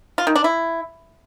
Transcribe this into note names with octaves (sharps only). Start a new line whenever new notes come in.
F4
D#3
D4
E4